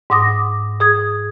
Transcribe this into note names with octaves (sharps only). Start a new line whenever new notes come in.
G#2 F#5 D6 D#6 A#6
G#4 D#6 G#6